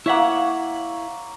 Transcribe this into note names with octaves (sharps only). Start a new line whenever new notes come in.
A#3 E4 C#5 E5 F#5